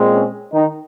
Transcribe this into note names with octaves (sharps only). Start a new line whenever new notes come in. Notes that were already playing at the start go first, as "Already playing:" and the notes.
Already playing: A#2 G#3 C4
C#4
D#3 D#4